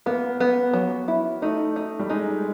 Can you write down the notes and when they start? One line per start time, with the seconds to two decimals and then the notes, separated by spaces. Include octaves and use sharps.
0.06 A#3 B3
0.40 B3
0.73 F#3
1.08 E4
1.42 A3 D#4
1.76 D#4
1.99 G3
2.09 G#3 D#4